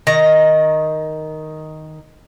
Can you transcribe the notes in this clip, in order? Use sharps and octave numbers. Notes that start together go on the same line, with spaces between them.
D#3 A#5